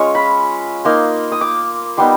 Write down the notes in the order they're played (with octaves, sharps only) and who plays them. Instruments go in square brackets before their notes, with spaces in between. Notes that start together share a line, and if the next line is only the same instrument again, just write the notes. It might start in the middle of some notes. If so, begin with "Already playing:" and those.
Already playing: [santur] G#3 C#4 F4 C#6
B5
A#3 D#4 C6
D#6
D6
G3 B3 D#4 C6